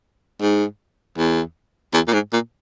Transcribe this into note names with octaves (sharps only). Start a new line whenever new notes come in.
G#2
E2
E2
A#2
G#2
A#2